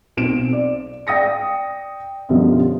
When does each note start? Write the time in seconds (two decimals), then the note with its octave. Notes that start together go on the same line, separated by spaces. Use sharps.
0.17 B1 C4 D7 E7
0.53 D5
1.07 D5 G5 D#6 A#6 C#7
2.29 F#2 B2 D3 F3 G3